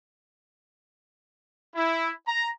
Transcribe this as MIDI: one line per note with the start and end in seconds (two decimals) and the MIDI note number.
1.75 2.09 64
2.26 2.48 82